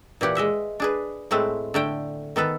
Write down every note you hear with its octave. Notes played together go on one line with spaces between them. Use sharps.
A#2 E3 G4 F#5
G#3 D#5 E5 F#5
D4 G#4 B4
A2 G#3 A3 C4 B4
D3 A3 G5
D#3 B3 A4 B4